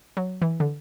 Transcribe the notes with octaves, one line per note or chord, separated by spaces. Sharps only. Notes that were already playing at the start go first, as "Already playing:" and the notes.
F#3
E3
D3